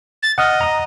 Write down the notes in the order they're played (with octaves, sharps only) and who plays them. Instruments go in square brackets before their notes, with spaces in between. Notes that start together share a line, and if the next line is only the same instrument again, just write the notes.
[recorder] A6
[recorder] D#5 [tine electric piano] F#5 D#6 F6
[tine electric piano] A#5 D#6